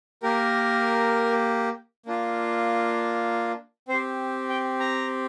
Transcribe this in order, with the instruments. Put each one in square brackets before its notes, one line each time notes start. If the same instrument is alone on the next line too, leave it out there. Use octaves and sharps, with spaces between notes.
[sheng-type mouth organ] A#3 G4 A#4
A#3 D4 F4
C4 G4 C5
G5
A#5